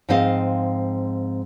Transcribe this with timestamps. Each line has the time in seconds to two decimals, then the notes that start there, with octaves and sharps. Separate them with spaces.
0.09 G#2 F3 C4 D#5 F5